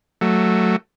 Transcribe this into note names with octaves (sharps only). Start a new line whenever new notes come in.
F#3 A3